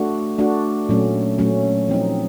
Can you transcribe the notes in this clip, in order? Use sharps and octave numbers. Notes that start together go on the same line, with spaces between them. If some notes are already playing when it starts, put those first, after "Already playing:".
Already playing: A3 D4 F#4
A3 D4 F#4
A#2 F#3 A3 C#4
A#2 F#3 A3 C#4
F3 A3 C4 D#4